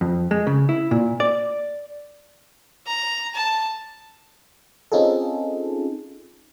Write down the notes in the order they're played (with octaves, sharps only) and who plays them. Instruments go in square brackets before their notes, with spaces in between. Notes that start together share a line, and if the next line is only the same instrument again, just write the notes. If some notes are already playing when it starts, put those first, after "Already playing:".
[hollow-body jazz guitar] F2
G#3
C#3
E4
A#2
D5
[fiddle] A#5
A5
[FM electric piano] C4 C#4 D#4 F4 G#4 A4